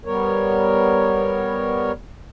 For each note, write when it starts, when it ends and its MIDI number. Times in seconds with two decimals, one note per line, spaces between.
0.05 1.92 55
0.05 1.92 59
0.05 1.92 70
0.05 1.92 73